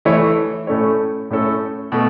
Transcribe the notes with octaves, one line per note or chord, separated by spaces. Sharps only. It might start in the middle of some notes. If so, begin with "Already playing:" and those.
E3 A3 E4 C#5
A2 A3 C#4 A4 C#5
A2 A3 C#4 A4
B2 A3